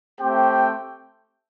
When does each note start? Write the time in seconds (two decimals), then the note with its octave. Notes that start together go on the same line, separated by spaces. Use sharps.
0.19 A3 C4 G4 C5 G5